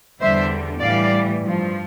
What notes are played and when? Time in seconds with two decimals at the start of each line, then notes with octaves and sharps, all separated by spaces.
0.21 E2 D3 G3 C5 E5
0.80 A2 E3 G3 D5 F5
1.41 G2 F3